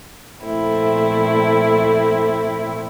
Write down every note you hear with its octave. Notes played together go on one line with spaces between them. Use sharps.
A#2 F3 A3 C4 E4